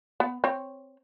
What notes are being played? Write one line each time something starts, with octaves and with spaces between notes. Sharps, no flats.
B3
C4 C#5